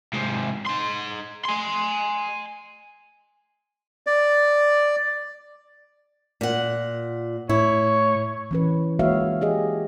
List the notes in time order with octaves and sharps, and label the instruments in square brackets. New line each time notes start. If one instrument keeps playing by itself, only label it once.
[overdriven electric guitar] G#2 C3
D#4 C6
G#5 C6
[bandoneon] D5
[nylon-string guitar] A#2 F#5
[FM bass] A2 [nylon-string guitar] E4 [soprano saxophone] C#5
[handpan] E3 C#4 B4
G#3 A#3 F#4 C#5 E5 F5
G4 G#4 D#5